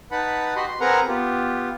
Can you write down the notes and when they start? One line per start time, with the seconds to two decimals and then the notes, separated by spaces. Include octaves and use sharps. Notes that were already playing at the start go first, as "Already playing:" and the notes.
0.11 D#4 B4 F#5 A5 B5
0.56 F#4 G4 D#5 B5 C6
0.68 C6
0.80 C4 G#4 A#4 B4 F#5 A#5
1.08 B3 F4 G4